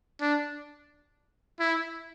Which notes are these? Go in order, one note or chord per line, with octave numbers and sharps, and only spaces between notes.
D4
E4